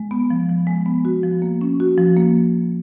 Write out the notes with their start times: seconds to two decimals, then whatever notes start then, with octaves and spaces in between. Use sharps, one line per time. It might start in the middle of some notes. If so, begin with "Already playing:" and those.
Already playing: G#3
0.11 B3
0.30 F3
0.49 F3
0.67 G#3
0.86 B3
1.05 F#4
1.23 F3
1.42 A#3
1.61 C#4
1.80 F#4
1.98 F3
2.17 A#3